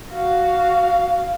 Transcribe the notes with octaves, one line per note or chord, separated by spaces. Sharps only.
F#4 F5